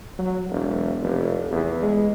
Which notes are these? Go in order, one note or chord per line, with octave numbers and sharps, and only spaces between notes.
F#3
E1
F1
E2
G#3